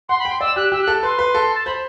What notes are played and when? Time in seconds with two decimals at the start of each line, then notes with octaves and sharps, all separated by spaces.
0.09 F#5 C6
0.19 B5
0.25 G5 C6
0.40 D5 E6
0.56 G4 F#6
0.72 G4 E6
0.82 F#6
0.88 A4
1.03 B4 C6
1.19 B4
1.35 A4
1.55 A5
1.66 C5 B5